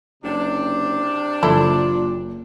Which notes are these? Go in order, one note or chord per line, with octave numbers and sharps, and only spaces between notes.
F#1 C3 D4
F#1 A#2 E4 A4